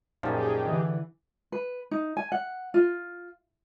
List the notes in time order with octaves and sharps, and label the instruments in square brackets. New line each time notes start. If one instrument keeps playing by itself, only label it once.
[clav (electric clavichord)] F#2 A#2 F3 [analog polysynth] D#4 G4 G#4
[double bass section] D3 E3
[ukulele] B4
D#4
G#5
F#5
F4